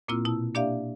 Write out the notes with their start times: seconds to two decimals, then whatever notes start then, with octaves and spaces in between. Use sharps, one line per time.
0.08 A#2 A#3 C4 E4 F4 E6
0.25 B2 E4 A5 E6
0.54 A#3 D4 G4 D5 E5 F5